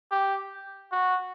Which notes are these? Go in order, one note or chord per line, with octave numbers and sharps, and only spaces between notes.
G4
F#4